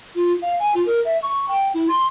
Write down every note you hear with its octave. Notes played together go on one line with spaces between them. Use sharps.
F4
F5
G#5
F4
A#4
E5
C#6
G5
E4
C6